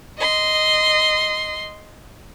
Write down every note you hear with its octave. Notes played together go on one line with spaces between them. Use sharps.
D#5 C6